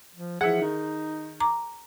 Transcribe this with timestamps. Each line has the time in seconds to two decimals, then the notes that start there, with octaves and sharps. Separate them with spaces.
0.16 F3
0.41 E3 F3 G#4 E5 F#5
0.61 D#3 D#4
1.40 A#5 D6